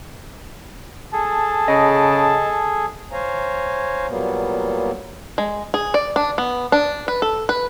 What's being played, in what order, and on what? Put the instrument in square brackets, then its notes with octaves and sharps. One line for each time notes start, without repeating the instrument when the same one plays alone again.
[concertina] G#4 A4 [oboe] A5
[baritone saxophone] C#3 [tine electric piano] D#5
[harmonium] C5 C#5 F5 G#5 A#5
A#2 F#3 G3 A#3 B3
[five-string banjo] G#3
G#4
D5
D4
B3
D4
B4
A4
B4